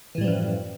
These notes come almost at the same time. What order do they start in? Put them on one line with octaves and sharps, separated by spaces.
E3 A2 G3 F3 F#2